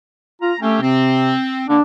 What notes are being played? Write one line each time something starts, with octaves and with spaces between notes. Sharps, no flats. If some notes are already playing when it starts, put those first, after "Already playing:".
F4 A#5
A3 C4 C#4 G4
C3 C4
D3 A#3 D4